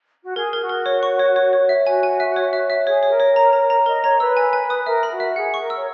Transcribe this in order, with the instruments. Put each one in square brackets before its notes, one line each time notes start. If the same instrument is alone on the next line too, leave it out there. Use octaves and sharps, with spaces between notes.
[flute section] F#4
[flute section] G#4 [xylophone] A#4
[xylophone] A#4
[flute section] F#4
[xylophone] A#4
C#5
C#6
C#5
C#5
C#5
E5
[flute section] F#4 [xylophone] G#5
[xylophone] G#5
E5
C#5
E5
E5
[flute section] G#4 [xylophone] C#5
[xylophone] C#5
[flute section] A#4
[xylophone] C#5
A#5
A#5
A#5
[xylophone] A#4 [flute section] D#5
[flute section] C#5 [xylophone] A#5
[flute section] B4 [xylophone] E6
[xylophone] G#5
G#5
D#6
[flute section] A#4 [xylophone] E5
[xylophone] B5
[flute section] F#4
[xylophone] E5
[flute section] G#4 [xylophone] F#5
[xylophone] C#6
[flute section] A#4
[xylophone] E6
[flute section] C#5